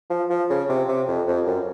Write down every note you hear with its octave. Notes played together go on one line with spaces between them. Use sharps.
F3
F3
C#3
C3
C3
F2
F2
F#2